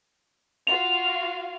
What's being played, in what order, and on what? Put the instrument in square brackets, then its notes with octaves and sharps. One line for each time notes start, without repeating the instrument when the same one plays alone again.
[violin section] F4 F#4 F5 [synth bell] F7